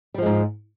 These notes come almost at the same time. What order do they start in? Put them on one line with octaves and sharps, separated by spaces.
G3 F3 G#3 G#2